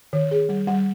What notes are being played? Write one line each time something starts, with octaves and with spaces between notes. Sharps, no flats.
D#3
G#4
G3
G3